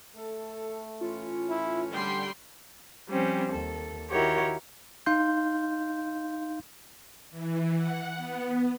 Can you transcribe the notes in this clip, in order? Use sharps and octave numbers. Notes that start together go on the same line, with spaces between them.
A3 A4
A2 E3 C#4 F4
E4
D3 G3 G5 C6
F3 G3 C4 C#4
D#2 A4
D#3 E4 F#4 G4 A#4 C#5
D#4 F5 C6 G6
E3
F#5
B3